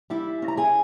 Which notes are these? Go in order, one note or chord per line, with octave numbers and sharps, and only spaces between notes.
G3 E4 E5
C#4
A#5
G#4 G#5